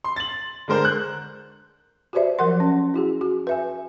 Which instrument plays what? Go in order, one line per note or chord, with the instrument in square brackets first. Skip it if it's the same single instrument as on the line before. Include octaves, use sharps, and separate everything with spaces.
[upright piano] C6
A6 F#7
D3 G#3 A#4 C5
F#6
[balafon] F#4 G4 B4 C5 D5 E5
F3 F#3 A#4 F#5 C6
C#4
E4 F#4 G#4
F#4
B4 E5 G#5